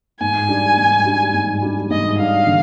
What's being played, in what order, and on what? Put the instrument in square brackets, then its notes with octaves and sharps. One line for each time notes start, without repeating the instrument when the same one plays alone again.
[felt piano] G#2 [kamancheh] G#5
[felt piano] G3 D4
G#2
G3 D4
G#2
G3 D4
[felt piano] G#2 [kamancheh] D#5
[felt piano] G3 D4 [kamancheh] F5
[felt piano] D3